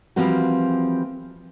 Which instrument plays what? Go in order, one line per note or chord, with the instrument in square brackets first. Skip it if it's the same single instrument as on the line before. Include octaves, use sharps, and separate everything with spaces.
[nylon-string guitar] E3 F3 G3 A#3 C4 F#4